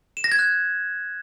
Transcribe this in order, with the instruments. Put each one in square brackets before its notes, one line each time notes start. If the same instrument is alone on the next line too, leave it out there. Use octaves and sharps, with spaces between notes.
[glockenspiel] E7
A#6
G#6
F#6